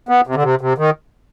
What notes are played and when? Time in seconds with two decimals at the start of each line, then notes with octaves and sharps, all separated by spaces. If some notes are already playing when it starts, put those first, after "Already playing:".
0.09 B3
0.27 C3
0.35 D3
0.43 C3
0.61 C3
0.78 D#3